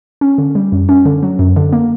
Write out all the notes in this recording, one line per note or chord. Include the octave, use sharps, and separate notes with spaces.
C#4
D3
G3
F#2
C#4
D3
F#3
F#2
D3
A#3